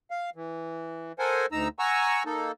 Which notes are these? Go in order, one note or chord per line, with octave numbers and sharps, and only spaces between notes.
F5
E3
A4 A#4 C5 F#5 G#5
D2 D#4 A#5 E6
F#5 G#5 A#5 C#6 E6
A#3 D#4 A4